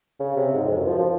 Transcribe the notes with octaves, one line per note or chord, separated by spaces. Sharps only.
C#3
C3
G#2
F2
F#2
F3
F3